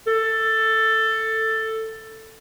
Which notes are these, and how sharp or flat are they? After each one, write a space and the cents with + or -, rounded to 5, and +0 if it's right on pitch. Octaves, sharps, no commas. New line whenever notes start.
A4 +10